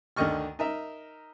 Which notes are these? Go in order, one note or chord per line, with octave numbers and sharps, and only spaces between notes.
D2 D3 D#3 D#5 C#6 F6
D#4 A#4 E5